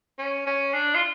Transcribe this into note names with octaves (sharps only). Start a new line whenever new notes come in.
C#4
C#4
D4
F4